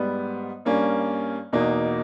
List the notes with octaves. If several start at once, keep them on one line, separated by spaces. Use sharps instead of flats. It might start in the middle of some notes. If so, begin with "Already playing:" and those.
Already playing: G#2 G3 B3
G2 G3 A#3 C#4
E2 B2 A#3 D#4